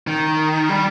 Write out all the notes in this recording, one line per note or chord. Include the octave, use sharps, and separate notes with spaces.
D#3
G3